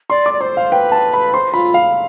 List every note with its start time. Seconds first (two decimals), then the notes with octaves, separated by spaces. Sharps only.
0.10 D5 C6
0.26 D6
0.33 D5
0.41 C5 C6
0.57 F5
0.72 B4 G5
0.92 A5
1.14 B5
1.34 C5 C6
1.54 F4 B5
1.74 F5